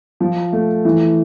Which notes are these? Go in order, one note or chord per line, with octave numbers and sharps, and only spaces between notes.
F3
A3
E3